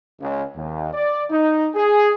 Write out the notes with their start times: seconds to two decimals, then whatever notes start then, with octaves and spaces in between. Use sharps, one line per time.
0.20 C#2
0.55 D#2
0.93 D5
1.30 D#4
1.75 G#4